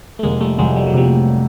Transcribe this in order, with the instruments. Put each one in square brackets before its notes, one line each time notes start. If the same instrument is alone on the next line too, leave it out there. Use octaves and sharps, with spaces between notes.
[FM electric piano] A3
[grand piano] F1 [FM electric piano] G#3 A#3
[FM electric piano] G3 A3
[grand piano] F1 [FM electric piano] F#3 G#3
[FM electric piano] G3
F#3
[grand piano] C3 [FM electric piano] F3 G3